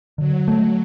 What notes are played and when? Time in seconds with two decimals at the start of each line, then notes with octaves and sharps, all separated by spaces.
0.18 D3 F#3
0.48 A3